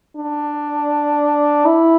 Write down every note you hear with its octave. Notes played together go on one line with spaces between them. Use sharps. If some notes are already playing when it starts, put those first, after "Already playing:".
D4
E4